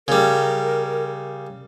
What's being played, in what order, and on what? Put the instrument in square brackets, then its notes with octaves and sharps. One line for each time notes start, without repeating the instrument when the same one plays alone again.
[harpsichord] C#3 G3 [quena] A#4